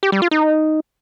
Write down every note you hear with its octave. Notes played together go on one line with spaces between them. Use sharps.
G4
G3
F4
D#4